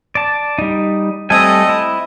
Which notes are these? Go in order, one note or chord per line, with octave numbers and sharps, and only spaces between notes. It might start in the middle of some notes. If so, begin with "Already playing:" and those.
D5 A5
G3 D#4
G3 A3 C4 A4 D#5 G#5
E4